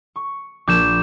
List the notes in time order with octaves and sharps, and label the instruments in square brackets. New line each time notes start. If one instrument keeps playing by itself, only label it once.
[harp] C#6
[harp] A#1 [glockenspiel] D6 G6 E7